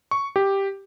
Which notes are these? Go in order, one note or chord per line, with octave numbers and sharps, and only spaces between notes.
C#6
G4